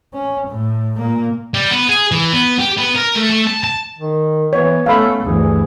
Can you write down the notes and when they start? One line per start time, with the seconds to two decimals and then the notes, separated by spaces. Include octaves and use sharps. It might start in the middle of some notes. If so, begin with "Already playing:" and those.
0.14 C#4
0.48 A2
0.97 A#2 A#3
1.54 G3
1.71 B3
1.89 G#4
2.12 E3
2.33 B3
2.60 G4
2.78 B3
2.96 A#4
3.16 A3
3.31 A3
3.47 A5
3.64 A5
3.99 D#3
4.53 E3 B3 C#5
4.86 A3 C#4 F5 B5
5.24 D2 G2 E3 G#4